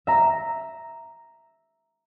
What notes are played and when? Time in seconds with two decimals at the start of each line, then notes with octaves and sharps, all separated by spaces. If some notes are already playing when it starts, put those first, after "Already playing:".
0.07 E5 A#5